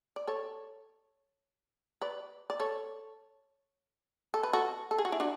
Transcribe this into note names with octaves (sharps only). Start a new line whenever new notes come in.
D5
A4 C#5
B4 D5
D5
A4 C#5
A4
B4
F#4 A4
A4
G#4
F#4
E4 G#4
D4 F#4